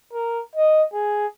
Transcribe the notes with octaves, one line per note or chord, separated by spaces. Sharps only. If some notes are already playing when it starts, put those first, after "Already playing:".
A#4
D#5
G#4